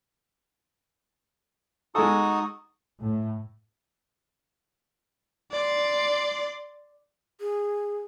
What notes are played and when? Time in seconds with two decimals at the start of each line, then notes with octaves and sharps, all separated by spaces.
1.95 G#3 D#4 F#4 A4 D#6
2.99 A2
5.52 D5 C6
7.40 G#4